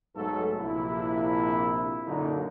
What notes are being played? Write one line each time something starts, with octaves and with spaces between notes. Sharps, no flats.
B1 G#2 F#3 A3 A4
A#1 C3 E4
F#2 A#2 D3 F#3 C#4 D#4